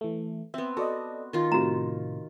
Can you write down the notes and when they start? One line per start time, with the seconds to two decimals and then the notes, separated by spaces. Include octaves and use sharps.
0.01 E3 A3
0.54 B3 C4 E5
0.77 F#4 A4 D5 D#5
1.33 D#3 F4
1.52 A2 C3 F#4 A#5